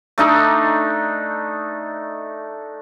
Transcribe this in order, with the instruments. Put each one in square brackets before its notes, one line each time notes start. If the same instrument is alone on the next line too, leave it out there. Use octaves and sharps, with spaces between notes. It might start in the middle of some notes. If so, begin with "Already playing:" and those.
[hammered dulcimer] A3 D4 D#4 A4